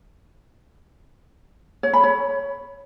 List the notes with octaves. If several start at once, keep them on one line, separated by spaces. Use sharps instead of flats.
C#5
B5
C#5